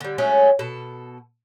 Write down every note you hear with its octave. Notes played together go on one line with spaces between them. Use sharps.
D3 G3
F#3 G#3 A3 C#4
B2 A4